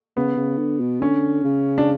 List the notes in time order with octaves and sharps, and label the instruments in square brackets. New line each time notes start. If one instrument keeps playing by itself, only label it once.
[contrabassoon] C#3 [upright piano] B3
[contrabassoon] C#3
D3
B2
[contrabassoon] D3 [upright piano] C#4
[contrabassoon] C#3
[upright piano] D4